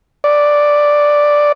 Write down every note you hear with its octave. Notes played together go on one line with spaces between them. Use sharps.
D5